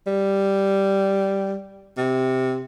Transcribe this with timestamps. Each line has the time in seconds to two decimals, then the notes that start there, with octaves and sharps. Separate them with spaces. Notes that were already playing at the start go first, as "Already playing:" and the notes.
0.07 G3
1.97 C3